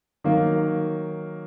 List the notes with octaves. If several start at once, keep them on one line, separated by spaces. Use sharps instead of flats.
D#3 F#3 A#3